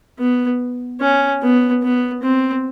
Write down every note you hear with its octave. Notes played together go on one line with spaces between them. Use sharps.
B3
C#4
B3
B3
C4